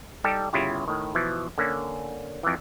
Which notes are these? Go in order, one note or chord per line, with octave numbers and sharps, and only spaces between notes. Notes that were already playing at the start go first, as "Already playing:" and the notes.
G3 D#4 G4 A4
G1 C#3 E4 F4 G4
A2 D#3
B2 E3 F3
D3 A#3 C#4
F2 E3